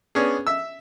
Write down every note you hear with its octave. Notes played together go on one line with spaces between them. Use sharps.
B3 C#4 D4 G#4
E5 E6